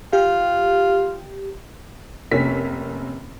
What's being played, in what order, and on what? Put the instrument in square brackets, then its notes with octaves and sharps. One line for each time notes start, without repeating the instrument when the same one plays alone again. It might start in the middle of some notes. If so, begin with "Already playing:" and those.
[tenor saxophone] F4 [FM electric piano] G4
[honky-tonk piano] F1 C3 A#3 C#4 B6